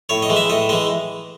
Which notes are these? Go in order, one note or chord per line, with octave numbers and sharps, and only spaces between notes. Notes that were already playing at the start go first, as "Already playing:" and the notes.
A2 C#5
D#5
E3 G#3
E5
A2 D#5
E3 G#3 D#5